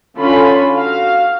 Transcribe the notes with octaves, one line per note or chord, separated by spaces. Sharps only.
D3 C#4 F4 B5
F#4 F5